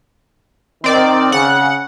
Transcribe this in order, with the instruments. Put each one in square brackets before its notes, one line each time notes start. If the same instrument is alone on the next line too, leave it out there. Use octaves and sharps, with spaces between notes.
[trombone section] D#3 [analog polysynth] C4 D5
[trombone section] C#3 [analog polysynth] F#5